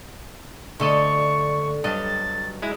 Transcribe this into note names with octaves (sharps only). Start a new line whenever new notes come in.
D2 D3 A4 D#5 C#6
G2 F#3 D#5 A6
G#3 E4